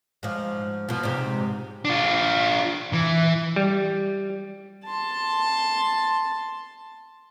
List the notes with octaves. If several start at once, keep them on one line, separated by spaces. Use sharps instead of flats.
G#2 F3
B2 F3
G#2 C3
D4 F4
E3
G3
A5 C6